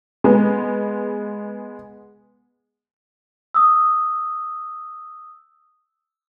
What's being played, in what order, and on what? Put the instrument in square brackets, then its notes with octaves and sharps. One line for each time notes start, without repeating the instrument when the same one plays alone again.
[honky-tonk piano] G#3 B3
[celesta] D#6 E6